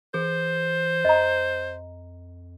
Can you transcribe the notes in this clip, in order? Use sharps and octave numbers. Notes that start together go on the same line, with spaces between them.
E3 G#4 C5
F2 D#5 A#5